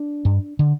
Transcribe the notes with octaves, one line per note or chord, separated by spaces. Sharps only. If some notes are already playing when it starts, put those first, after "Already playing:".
Already playing: D4
G2
D3